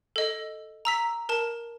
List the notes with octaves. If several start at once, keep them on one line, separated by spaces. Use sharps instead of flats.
A4 D#5
A#5 E6 B6
A#4 A5 E7